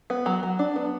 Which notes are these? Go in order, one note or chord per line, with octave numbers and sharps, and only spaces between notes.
B3
F#3
F#3
D4
B3